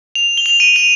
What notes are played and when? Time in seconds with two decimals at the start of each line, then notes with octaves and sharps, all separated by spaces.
0.15 F7
0.37 G7
0.46 F7
0.60 D#7
0.76 F7